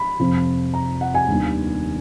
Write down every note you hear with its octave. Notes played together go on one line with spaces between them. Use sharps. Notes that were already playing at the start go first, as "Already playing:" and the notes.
Already playing: B5
F2 C3 F3
A#5
F#5
G#5
D#2 D#3 G3 B3 D4